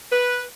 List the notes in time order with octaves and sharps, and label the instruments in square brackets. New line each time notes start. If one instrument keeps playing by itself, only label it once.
[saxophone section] B4